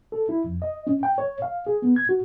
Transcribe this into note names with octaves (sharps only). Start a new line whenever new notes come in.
A4
E4
F2
D#5
C#4
G5
C#5
F5
G#4
B3
G#6
F#4